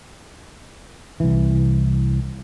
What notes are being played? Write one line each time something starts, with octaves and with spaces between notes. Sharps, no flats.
C2 E3